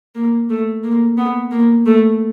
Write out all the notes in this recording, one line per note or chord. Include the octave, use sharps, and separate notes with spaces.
A#3
A3
A#3
B3
A#3
A3